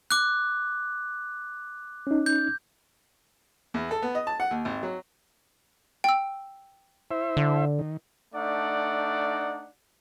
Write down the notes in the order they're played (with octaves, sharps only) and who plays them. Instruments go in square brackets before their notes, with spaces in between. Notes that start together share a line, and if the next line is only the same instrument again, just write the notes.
[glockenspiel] D6 F#6
[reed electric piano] C#4 D#4
[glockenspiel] G6
[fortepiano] E2
A4
B3
D#5
A5
F#5
D#2
G#1
F#3
[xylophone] G5 E6
[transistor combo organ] E4 C5 E5
[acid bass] D3
[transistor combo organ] D#3
[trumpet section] A3 D4 D#4 D5 F#5